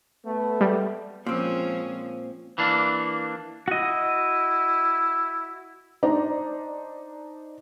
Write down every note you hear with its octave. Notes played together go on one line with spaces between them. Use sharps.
A3 B3
G3
A#2 F3 G#3 C4 C#4
E3 A#3 D4
E4 F#4 D#5
D4 D#4 C5 D5 A#5